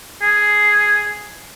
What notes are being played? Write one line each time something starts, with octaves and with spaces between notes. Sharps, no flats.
G#4